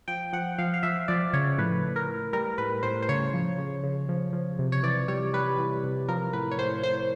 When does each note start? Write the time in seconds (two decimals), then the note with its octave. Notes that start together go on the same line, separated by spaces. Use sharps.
0.08 F3 G5
0.33 F3 F#5
0.58 F3 F5
0.74 F5
0.83 F3 E5
1.08 F3 D5
1.33 C#3 C#5
1.58 A2 B4
1.83 A2
1.96 A#4
2.08 A2
2.33 G3 A#4
2.58 A2 B4
2.83 A2 C5
3.02 C5
3.09 C#3 C#5
3.34 F3
3.58 C#3
3.84 C#3
4.09 F3
4.33 F3
4.59 C3
4.72 C#5
4.83 E3 D5
5.08 G3 C#5
5.33 G3 B4
5.58 E3
5.84 C3
6.08 F3 A#4
6.33 A2 B4
6.51 C#5
6.58 A2 C5
6.83 A2 C5